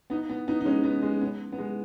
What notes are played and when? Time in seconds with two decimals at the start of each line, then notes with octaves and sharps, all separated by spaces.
0.10 B3 D#4
0.29 B3
0.48 B3 D#4
0.61 D#4
0.65 G#3 C#4
0.84 B3
1.02 G#3
1.21 B3
1.52 B3
1.58 G#3